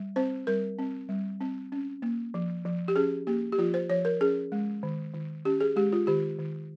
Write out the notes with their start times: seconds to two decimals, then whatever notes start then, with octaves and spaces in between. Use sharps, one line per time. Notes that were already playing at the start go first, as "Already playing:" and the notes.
Already playing: G3
0.16 C4 C5
0.47 G3 A#4
0.79 C4
1.09 G3
1.41 C4
1.72 C#4
2.02 A#3
2.34 F3
2.65 F3
2.88 G4
2.96 C#4 G#4
3.27 A#3 G4
3.52 G4
3.58 F3 F4
3.74 C5
3.90 F3 C#5
4.05 A#4
4.21 C#4 G#4
4.52 G#3
4.83 D#3
5.14 D#3
5.45 C#4 G4
5.61 G#4
5.76 G#3 G4
5.92 F4
6.07 D#3 G4
6.38 D#3